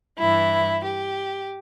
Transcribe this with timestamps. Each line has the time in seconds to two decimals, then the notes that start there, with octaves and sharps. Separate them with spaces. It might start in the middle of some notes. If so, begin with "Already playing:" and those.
0.18 G2 E3 E4
0.84 G4